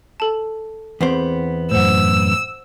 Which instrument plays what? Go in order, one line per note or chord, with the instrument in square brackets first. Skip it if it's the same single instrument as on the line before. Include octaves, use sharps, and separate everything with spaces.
[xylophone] A4 A5
[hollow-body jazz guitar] E2 B3 C4
[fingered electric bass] F#2 A2 [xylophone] C5 F#5 [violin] E6